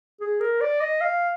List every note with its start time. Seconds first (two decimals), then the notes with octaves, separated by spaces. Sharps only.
0.21 G#4
0.40 A#4
0.61 D5
0.81 D#5
1.01 F5